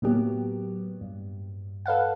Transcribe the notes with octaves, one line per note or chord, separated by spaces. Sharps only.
A2 F#3 A#3 B3 G4
G2
A4 B4 F5 F#5